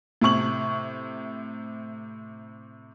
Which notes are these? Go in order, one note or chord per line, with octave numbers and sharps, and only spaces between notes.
A2 C3 C#6 F#7